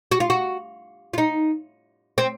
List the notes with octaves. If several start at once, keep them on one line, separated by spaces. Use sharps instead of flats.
F#4
F4
F#4
F4
D#4
C4